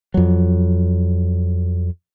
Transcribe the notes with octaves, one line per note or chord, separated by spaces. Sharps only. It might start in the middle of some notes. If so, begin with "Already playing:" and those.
F2 F#3